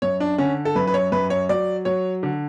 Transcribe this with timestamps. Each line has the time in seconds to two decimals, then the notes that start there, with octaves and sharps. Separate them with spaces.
0.02 F#2 C#5
0.20 D4
0.38 D3 C#4
0.65 A4
0.75 F#2 B4
0.87 B4
0.94 C#5
1.12 F#2 B4
1.30 C#5
1.49 F#3 D5
1.85 F#3 C#5
2.23 D3